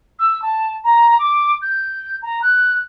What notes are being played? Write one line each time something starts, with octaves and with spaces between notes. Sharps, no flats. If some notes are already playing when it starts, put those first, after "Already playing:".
E6
A5
A#5
D6
G6
A#5
F#6